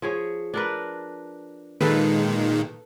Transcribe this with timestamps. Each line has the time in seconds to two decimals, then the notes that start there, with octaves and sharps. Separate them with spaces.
0.02 F3 G#4 C#5
0.54 D4 A#4 B4
1.81 A#2 D#3 G#3 A4 B4